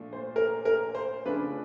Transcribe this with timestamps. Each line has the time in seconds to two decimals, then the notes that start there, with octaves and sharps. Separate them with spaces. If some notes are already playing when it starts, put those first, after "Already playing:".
Already playing: A#2 F3 A3 D4
0.13 C5
0.36 A#4
0.65 A#4
0.95 C5
1.25 C#3 F3 A3 D4 B4